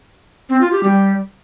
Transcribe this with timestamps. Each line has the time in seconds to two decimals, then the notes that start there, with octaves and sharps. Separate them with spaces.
0.49 C4
0.61 F4
0.72 G4
0.83 G3